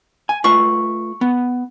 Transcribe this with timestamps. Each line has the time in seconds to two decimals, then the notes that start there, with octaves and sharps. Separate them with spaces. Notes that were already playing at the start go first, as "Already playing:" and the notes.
0.29 G#5
0.44 A3 F4 B4 C#6
1.21 B3